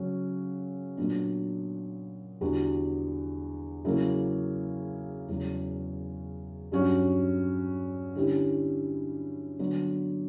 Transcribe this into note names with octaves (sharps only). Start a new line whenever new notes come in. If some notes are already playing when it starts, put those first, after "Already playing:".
Already playing: C#3 F#3 C#4
A#2 F#3 B3 D4
E2 D3 G3 B3 F#4
C#3 F#3 A#3 E4
E2 C#3 F#3
G2 F#3 C#4 F#4
D3 G3 C#4 E4 G4
D3 F#3 B3